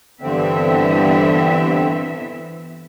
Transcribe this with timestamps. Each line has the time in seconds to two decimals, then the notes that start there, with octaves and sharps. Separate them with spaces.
0.21 G2 D3 E3 B3 C4 E5